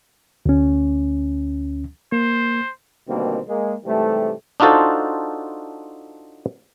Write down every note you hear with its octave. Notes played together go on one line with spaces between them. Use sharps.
D2 C#4
A#3 C5
D2 B2 D#3 G3 A#3 C4
G#3 A#3
G#2 C3 E3 G3 A3
D4 D#4 F4 F#4 A4 C5